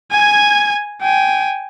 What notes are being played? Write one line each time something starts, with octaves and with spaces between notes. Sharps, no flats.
G#5 G#6
G5 G#5